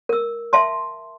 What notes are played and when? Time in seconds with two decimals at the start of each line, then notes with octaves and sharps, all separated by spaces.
0.09 A#4 E6
0.53 E5 F5 A5 C6